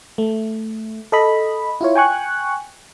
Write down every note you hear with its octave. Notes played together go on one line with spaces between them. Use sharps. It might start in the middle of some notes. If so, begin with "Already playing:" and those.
A3
A4 D#5 B5
E4 F4 C#5
G5 G#5 C#6 F#6